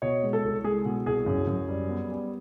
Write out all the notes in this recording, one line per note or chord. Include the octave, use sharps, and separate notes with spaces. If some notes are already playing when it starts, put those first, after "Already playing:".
B2 C#5 D#5
G#3
A4
C2
G#3 G#4
B2
C2 G#4
F#2
F#2
G3
B3
G3